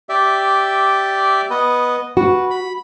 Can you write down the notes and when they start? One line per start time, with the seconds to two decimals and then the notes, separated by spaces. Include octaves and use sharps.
0.09 G4 D5 E5
1.50 B3 B4 D#5
2.17 F#4 B4
2.51 B5